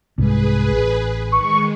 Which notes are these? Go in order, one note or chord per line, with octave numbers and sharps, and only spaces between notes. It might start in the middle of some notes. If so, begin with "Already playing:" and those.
C2 G#2 G#4 B4
A1
D#3 G#3 C#6